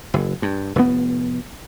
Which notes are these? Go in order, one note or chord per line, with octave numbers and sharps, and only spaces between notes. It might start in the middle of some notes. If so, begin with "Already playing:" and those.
F#1
G2
F1 A2 B3